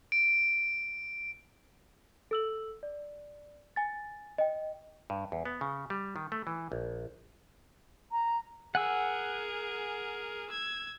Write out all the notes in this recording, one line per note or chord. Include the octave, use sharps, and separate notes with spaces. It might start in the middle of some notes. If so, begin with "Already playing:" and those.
D7
A4 E6 F#7
D5
G#5 A6
D#5 G5
G2
E2
B3
C#3
G3
D#3
A3
E3
A#1
A#5
G#4 A#4 F#5 G#5 E6
E6 G#6